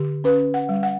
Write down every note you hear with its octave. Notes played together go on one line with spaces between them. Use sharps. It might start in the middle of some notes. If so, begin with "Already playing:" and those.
Already playing: D3 G4
C#4 B4
F#5
G3
F#5